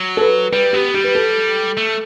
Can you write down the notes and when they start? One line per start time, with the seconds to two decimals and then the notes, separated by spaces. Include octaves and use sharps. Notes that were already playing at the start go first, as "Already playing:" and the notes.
Already playing: F#3
0.17 A4
0.21 B4
0.52 G3 B4
0.73 B3 G4
0.94 G3 G4
1.04 B4
1.15 A4
1.77 A3